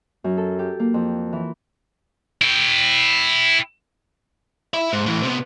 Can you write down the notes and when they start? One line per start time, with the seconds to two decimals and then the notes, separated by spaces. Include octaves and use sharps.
0.24 F#2
0.37 A4
0.59 G4
0.79 A#3
0.94 F2
1.32 E3
2.41 E4 G5
4.74 E5 B5
4.93 G#2
5.06 A2 E3
5.23 C3 B3